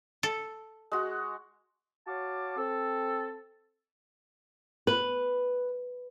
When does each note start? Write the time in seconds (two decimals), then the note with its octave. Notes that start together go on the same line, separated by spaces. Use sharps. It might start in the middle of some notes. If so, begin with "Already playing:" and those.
0.23 A4
0.92 G#3 F#4
2.07 F#4 C#5 F5 A5 D6
2.57 C4 A4
4.87 B4